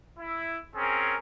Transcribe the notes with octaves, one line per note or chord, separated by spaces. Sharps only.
E4
C4 C#4 G#4 A#4